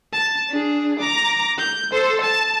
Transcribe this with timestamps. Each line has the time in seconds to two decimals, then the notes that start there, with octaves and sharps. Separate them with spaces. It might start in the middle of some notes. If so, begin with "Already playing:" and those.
0.13 A5
0.50 D4 G#4
0.99 A#5 D6
1.58 G6
1.92 A4 C5
2.22 A5